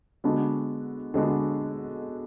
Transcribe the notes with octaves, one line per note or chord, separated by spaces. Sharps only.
D3 G#3 B3 D4 F#4
D3 G#3 B3 D4 F#4